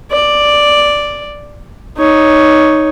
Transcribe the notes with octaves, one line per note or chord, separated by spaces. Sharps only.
D5
D#4 C#5